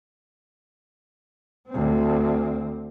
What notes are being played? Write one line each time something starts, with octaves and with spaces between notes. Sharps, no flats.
D2 C4